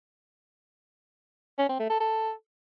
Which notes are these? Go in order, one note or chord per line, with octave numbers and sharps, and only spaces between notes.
C#4
C4
A3
A4
A4